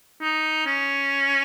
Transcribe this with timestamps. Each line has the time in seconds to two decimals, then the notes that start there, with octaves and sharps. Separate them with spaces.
0.21 D#4
0.66 C#4